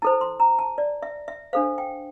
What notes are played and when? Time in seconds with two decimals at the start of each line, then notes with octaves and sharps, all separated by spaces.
0.02 E4 A4 C5 A5
0.21 C6
0.40 A#5
0.59 A5
0.78 D5
1.03 E5
1.28 E5
1.53 D4 A4 C5 F5
1.78 G5